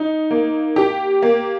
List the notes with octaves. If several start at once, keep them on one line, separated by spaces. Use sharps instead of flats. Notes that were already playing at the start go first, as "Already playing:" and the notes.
Already playing: D#4
A#3
G4
A#3